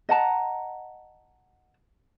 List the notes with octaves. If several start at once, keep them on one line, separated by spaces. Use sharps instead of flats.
D#5 F#5 A5 A#5